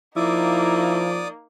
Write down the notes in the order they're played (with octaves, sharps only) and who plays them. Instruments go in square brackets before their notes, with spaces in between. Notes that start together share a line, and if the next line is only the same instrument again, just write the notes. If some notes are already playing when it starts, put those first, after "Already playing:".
[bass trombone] F3 [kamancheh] A#3 D#4 [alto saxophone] E4 [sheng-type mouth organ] D5 D6 D#6